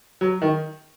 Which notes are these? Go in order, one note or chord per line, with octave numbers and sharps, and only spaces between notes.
F#3
D#3